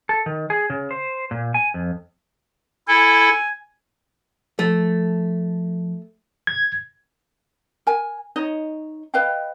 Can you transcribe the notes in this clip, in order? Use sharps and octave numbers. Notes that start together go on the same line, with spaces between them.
A4
D#3
G#4
C#3
C5
A#2
G#5
F2
E4 A4 G#5
F3 A3
G#6
A#4 G#5
D#4 C#5 D#5
B4 D#5 F5 G5